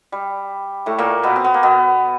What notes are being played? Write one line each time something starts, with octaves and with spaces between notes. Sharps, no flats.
G3
A2 A3
A#2 A#3
B2 B3
C4
B3
A#3
B2 B3